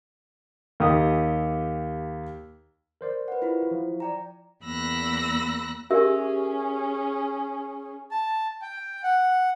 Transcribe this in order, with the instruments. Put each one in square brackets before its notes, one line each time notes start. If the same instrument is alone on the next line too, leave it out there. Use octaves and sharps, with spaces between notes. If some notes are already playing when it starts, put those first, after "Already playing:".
[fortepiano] D#2 G4 D#6
[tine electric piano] A#4 C5 D5
[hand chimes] B4 F#5
E4 F4 G4
[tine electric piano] F3
[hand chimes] D5 G5 A#5
[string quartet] E2 A#3 B5 E6 F#6 A#6
[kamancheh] C#4 G#4 [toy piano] G4 A#4 E5
[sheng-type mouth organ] A5
G5
F#5